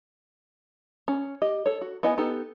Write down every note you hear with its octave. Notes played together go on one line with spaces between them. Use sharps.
C#4
G4 D#5
A4 C#5
F#4
B3 E4 D#5 F#5 G#5
B3 D#4 G4 A4